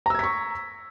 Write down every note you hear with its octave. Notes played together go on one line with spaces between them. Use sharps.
A#5 C#6 E6 G#6 B6